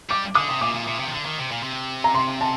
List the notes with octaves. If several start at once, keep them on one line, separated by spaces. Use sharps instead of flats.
G3 D6
D3 D#6
C3
A#2 D6
A#2
A#2
C3
D#3
D3
D#3
C3
A#2
C3
A#5
C6
A5